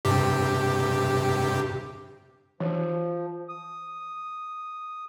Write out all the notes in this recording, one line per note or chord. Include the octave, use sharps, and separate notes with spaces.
G2 C3 G4
E3 F3
D#6